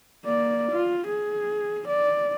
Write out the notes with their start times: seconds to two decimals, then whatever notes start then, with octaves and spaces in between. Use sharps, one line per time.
0.24 A#3 D5
0.72 F4
1.08 G#4
1.88 D5